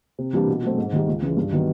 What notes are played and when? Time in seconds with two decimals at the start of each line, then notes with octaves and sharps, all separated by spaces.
0.19 C3
0.33 E3 G3 A#3 D4
0.48 B2
0.63 F#3 A3 C4
0.78 G#2
0.92 D#3 G3
1.08 C#2
1.22 C#3 E3 G#3
1.37 G2
1.52 D#3 F#3 B3